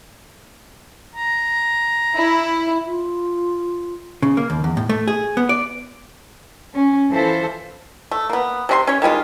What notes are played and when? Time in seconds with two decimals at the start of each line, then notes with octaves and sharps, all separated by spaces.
1.16 A#5
2.17 E4
2.85 F4
4.23 C#3
4.37 A#3
4.50 D#2
4.64 E2
4.77 A2
4.89 A3
5.08 G#4
5.37 B3
5.49 D5
6.74 C#4
7.11 E3 F4 A4 C5 E5
8.11 A3
8.30 A#3 B3
8.69 C3 D4 C6
8.87 C#4 C#5
9.02 D#3 G3 G#3 F4